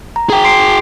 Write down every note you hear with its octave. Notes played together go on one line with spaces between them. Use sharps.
A#5
G#4 G5
C6 C7 D7